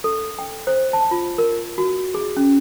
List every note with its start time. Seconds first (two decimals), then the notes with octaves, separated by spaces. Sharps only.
0.04 A4
0.39 G5
0.67 C5
0.93 A5
1.11 F4
1.38 A#4
1.78 F#4
2.14 G#4
2.37 C#4